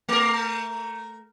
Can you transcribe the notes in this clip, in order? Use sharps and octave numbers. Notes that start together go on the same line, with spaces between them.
A3 A#4